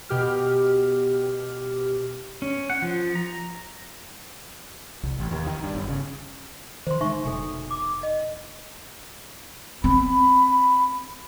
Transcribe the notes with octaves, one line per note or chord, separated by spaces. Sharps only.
B2 G4 F6
C#4
F#5
F3
A#5
C2
A1
D#2
D#3
G2
G1
C#3
D#3 C5 C6
D3 D#3 G#3 D#4 E5 C#6
F1 B2 D3 A4 G#5
D6
D#5
C4 B5